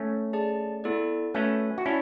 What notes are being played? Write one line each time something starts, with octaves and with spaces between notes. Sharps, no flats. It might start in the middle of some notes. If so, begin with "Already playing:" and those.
Already playing: A3 C#4
G#4 D5 A5
B3 E4 A4 D5
A3 C#4 F#4 B4 E5 G#5
F#4
C#4 E4 D5 A5